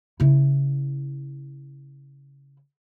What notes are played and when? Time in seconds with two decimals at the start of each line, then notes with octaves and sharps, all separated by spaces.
0.20 C#3 E4